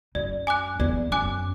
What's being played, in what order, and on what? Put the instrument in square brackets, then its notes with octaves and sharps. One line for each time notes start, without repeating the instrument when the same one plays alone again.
[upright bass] F#2 [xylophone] D5
[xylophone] G#5 D6 F#6
[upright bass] E2 [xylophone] D5
[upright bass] F#2 [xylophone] G#5 D6 F#6